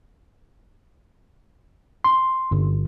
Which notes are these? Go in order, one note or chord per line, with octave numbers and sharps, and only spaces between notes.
C6
G1